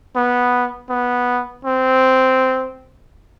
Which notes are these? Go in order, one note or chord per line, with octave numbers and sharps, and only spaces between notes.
B3
B3
C4